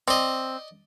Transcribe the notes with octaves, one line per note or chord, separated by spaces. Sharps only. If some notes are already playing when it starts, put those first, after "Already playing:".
C4 D5 D#5